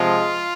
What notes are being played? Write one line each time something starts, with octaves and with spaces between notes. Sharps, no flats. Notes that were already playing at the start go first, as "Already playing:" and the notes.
Already playing: C3 F3 G#3 F4